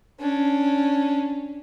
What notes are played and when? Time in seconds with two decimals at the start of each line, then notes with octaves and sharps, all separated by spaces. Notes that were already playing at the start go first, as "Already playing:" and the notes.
0.20 C#4 D4